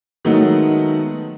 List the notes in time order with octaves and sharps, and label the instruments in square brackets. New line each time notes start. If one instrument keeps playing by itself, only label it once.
[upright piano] D#3 F#3 G#3 A3 B3 D#4